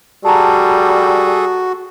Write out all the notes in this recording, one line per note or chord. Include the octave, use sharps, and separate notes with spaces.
G3 F#4 G#4 A4 A5 A#5